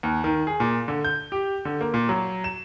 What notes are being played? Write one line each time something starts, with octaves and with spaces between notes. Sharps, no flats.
D#2
D#3
G#4
A#2
D3
G6
G4
D3
A#3
A#2
F#3
E7